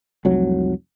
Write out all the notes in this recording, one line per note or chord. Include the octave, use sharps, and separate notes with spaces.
F1 C2 F#3